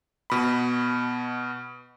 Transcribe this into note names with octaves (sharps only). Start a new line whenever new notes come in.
B2 B5